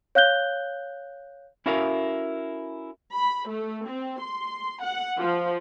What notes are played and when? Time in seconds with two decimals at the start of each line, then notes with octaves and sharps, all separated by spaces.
0.15 C#5 F5 F#6 G6 G7
1.66 C#4 E4 F#4 A4 A#4 F5
3.15 B5
3.49 A3
3.88 C4
4.21 C6
4.83 F#5
5.18 F3